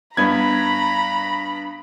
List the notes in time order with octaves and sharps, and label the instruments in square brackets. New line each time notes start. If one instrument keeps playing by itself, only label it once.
[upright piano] G2 B3 G#6 [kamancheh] A#5 B5